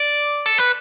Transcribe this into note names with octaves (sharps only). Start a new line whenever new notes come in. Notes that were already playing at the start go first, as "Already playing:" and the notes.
Already playing: D5
A4
B4